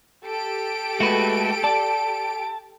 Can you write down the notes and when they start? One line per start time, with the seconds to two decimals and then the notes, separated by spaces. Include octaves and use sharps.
0.24 G4 A4 D7
1.00 G#3 A3 F#4 B4
1.64 D5 A5